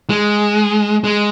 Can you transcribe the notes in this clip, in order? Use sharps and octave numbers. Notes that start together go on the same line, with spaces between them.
G#3
G#3